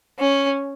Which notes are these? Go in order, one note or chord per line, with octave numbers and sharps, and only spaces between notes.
C#4